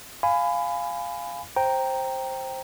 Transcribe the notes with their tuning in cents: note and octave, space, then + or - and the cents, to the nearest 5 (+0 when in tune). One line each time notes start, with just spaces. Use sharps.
F5 +0 G#5 +0 B5 +25
C5 +10 G5 +0 A#5 +0